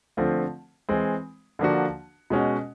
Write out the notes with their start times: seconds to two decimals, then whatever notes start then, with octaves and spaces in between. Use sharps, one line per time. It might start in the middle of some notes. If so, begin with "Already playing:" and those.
0.17 D3 F3 A3 C4 F4
0.89 E3 G#3 C4
1.59 D3 F3 A#3 D4 F#4
2.30 B2 G#3 C#4 F#4